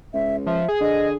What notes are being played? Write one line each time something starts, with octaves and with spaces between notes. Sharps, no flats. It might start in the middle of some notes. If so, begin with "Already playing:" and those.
C#2 E5
F3 E5
G#4
D3 D#5